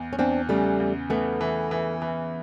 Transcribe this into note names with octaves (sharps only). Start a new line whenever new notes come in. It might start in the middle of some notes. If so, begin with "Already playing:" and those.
Already playing: E2
C#4
E2 C4 D4
C#3 G3 A3
E2
E3 A3 B3
E3
E3
E3